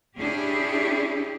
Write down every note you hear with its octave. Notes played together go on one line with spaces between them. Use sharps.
C#4 D4 E4 G4 G#4